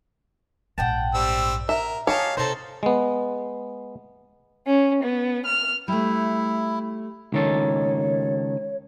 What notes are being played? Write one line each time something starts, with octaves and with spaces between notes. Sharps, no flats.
A#1 G#2 F#5 G5 A5
G3 C4 E6
A#4 E5
F4 G4 C#5 D#5 F5 G#5 A5
C3 C4 D#4 A4 C5
G#3 B3
C#4
B3
F6
G3 A3 E4
C#2 D#3 A4 C#5